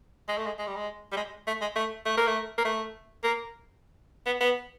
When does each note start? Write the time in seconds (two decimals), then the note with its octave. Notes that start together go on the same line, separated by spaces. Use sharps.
0.28 G#3
0.37 A3
0.46 G#3
0.59 G#3
0.67 G3
0.75 G#3
1.12 G3
1.16 G#3
1.47 A3
1.61 G#3
1.75 A3
2.05 A3
2.17 A#3
2.27 A3
2.58 A#3
2.65 A3
3.23 A#3
4.26 B3
4.40 B3